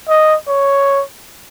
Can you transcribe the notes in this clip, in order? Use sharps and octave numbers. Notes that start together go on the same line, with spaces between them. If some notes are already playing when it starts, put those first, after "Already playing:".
D#5
C#5